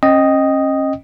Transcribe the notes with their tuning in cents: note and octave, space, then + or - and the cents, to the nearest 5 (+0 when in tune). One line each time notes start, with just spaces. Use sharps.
C#4 -35 D#5 +0 G5 +0